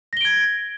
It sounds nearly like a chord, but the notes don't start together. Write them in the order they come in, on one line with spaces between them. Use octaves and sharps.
A#6 G7 D7 G#6